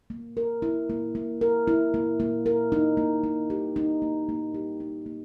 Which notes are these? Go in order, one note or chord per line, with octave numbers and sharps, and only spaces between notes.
A#3
A#4
E4
A#3
A#3
A#4
E4
A#3
A#3
A#4
D#4
A#3
A#3
G4
D#4
A#3
A#3
G4
D#4
A#3